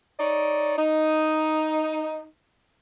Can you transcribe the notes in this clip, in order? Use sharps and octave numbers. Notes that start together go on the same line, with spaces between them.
D#4 C#5 D5
D#4